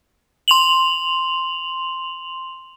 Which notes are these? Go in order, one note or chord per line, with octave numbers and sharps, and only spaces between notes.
C6 F7 F#7